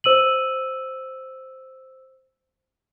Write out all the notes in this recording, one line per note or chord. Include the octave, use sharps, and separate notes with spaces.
C5 E6 D#7 F#7